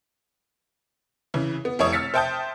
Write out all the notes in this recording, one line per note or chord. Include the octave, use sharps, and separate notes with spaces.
C#3 E3
B3
F1 E4 C#5 D#6
E6 F6 A6 B6 C#7
C5 E5 G5 A5 D#6 G6